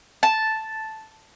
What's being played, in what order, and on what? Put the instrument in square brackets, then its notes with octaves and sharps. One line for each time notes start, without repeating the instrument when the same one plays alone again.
[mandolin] A5